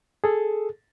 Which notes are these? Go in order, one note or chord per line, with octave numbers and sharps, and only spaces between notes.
G#4 A4